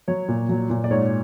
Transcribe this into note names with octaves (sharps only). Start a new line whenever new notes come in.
F#3 C#5
A#2
F#3
A#2
D5
G#2 C#5